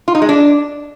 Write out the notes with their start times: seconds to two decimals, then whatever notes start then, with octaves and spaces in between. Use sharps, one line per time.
0.08 F4
0.15 D#4
0.22 G#3
0.29 D4